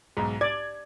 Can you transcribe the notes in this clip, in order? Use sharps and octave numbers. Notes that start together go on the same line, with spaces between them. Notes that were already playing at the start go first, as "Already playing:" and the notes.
B1 G#2
D5 G#6